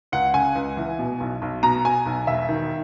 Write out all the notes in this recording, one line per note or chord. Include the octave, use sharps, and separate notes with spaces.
C#2 F#5
C#3 G#5
C#2
E3
B2
B1
B1
B2 A#5
B2 G#5
B1
E1 E5
D#3